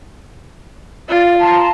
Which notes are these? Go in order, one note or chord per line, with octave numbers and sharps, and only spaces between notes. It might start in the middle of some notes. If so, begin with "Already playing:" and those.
F4 D5
A5 A#5 C6